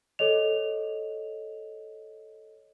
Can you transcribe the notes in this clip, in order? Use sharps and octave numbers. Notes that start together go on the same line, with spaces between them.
A4 C#5 D#5 F7